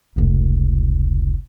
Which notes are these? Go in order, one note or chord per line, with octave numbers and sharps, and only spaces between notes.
F1 C#2